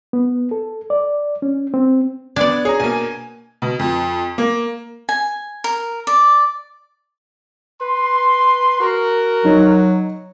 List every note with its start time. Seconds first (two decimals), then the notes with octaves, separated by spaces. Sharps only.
0.13 B3
0.51 A4
0.90 D5
1.42 C#4
1.74 C4
2.36 B3 D4 D5 G#6
2.65 G#4 C#5 A#5
2.80 B2 A#3 G#5
3.62 B2
3.79 F2
4.38 A#3
5.09 G#5
5.64 A#4
6.07 D5
7.81 B4 C6
8.81 F#4 A#4
9.45 F#3 D#4